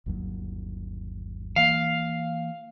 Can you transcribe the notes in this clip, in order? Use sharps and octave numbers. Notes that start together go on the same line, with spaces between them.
G1 D#2 F#3
E3 A#3 F5